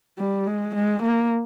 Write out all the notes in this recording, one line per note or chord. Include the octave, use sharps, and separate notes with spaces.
G3
G#3
G#3
A#3